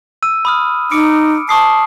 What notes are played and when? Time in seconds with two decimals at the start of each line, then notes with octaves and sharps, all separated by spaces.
0.23 E6 D#7
0.45 B5 D#6 F6
0.91 D#4 D6 C#7 D7
1.49 A5 C#6 D#6 C7